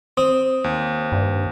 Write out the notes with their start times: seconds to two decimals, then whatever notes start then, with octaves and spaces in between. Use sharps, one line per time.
0.17 C4 D#6
0.64 D#2
1.12 G2